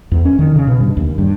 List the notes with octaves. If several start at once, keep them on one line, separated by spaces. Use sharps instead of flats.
E2
C#4
D#3
C#3
B2
G2
D#2
G2